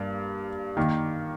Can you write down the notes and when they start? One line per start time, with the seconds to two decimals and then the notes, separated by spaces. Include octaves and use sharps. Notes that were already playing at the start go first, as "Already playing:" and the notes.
Already playing: G2 A#3
0.77 D#3 A#3